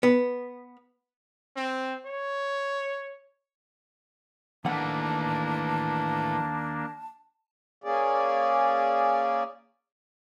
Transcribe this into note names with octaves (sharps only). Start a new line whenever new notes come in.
B3
C4
C#5
D#2 E3 A3 A#3 D4 F#5 A5
A#3 C#4 G#4 D5